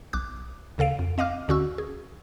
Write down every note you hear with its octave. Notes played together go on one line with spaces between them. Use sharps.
B1 D6 F#6
D2 C#3 A4 F5 D7
F2
C4 D#5 F5 D6 F6
D2 D3 C#4 F#4 C#6 E6
G#4